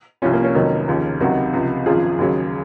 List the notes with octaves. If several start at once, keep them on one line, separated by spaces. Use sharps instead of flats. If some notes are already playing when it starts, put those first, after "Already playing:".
C2 C3 F3 C#4 F4
A#3 C#4
A#3 C#4
F1 F2 D#3 F#3
D#2 C#3 F3
C#2 C3 D#3 F#3 D#4 F#4
C#2 C3 F3
G#1 F#2 F3 F4 G#4
D#2 C#3 F#3